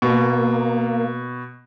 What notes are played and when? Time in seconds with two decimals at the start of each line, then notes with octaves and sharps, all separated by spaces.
0.02 B2 A#3